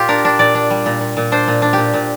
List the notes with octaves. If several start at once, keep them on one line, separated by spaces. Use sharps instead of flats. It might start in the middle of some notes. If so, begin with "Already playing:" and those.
Already playing: A#2 F4 G4
D4 A#4
D4
A#2 D5
D4
G3
A#2
A#2
A#2
D4 C5
A#2
D4
A#2 G4
A#2